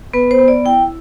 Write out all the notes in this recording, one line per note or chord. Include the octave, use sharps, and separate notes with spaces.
B3 B4
C5
B3
D5
E4 G5